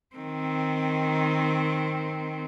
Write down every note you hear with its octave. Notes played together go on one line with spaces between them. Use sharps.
D#3 C4